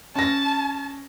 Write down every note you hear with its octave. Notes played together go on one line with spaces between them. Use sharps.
C#4 A5 A#6